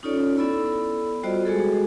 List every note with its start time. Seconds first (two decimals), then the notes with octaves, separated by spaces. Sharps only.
0.03 C#4 D#4 F4 A4 C#5 D5
0.37 B3 E4 A4 D5 B5 E6
1.24 G3 F4 F#4 C5 D5 D#5
1.45 G#3 F#4 G#4 A4